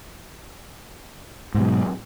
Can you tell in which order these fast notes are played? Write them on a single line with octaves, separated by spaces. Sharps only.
G#2 B2 F#3